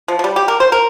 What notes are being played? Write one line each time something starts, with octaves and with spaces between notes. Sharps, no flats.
F3
F3
G3
G4
A#4
C5
A#4